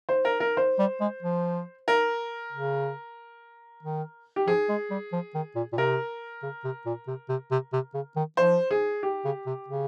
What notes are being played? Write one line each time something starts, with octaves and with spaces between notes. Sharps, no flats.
C5
A#4
A#4
C5
G3
G#3
F3
A#4
C#3
D#3
G4
F3 G#4
G#3
G3
F3
D#3
A#2
A#2
C3 A#4
C#3
C3
A#2
C3
C3
C3
C3
C#3
D#3
F3 C5
G#4
G4
C#3
C3
C#3